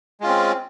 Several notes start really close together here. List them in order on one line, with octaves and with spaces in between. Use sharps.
G#3 F4 C#4 C4